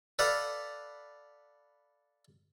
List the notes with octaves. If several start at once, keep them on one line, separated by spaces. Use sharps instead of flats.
A4 B4 D5 F5 F#5